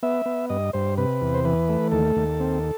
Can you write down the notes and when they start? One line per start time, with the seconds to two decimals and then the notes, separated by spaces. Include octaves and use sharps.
0.03 B3 E5
0.26 B3
0.50 G2 D#5
0.73 G2 C5
0.98 C3 B4
1.21 E2
1.34 C5
1.45 E3 B4
1.69 A3
1.92 D#2 A4
2.16 D#2
2.40 C4